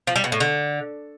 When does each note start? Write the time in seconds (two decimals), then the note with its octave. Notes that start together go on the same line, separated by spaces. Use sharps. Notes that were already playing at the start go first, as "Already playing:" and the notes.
0.07 F3
0.16 G3
0.24 B2
0.32 A2
0.40 D3